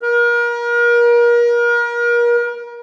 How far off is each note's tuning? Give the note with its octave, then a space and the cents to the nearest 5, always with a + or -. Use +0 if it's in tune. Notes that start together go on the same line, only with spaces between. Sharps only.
A#4 +35